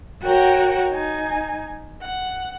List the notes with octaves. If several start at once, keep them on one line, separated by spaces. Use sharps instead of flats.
F#4 A#4 C#5 F#5 G5
D#4 G#5
F#5